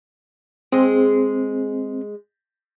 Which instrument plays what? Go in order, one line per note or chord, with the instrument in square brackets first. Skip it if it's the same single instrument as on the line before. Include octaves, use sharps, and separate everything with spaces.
[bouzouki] G#3 G#4 [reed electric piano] C4